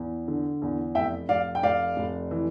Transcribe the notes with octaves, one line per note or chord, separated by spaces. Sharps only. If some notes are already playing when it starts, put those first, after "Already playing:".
Already playing: E2
D3
E2
F1 E5 G5
F1 D5 F5
G5
F1 D5 F5
F1
E3